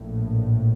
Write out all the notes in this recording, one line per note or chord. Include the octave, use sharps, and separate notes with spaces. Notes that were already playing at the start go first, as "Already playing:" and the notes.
Already playing: A#1 A2